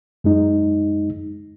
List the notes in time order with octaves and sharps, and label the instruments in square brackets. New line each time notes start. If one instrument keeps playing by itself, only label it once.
[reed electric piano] F#2 G#3 D#4